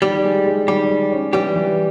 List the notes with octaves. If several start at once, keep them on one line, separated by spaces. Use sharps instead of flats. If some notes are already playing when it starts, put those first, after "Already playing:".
D#3 G3 G4
G#3
G#3
D#3 G3 G4
G#3
C#4
E3 G3 G4
E3